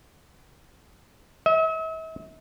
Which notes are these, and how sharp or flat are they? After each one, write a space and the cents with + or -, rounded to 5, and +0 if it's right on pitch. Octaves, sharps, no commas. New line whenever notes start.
E5 -45